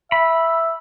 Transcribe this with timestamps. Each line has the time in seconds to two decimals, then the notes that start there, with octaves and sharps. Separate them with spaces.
0.12 E5 B5